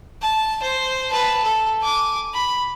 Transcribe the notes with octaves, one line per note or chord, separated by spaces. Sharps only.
A5
C5
B4 A5
A4
G#5 D6
B5